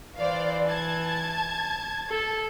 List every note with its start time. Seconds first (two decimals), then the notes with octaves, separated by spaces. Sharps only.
0.17 E3 C5 D5 F5
0.68 A5 G#6
2.10 A4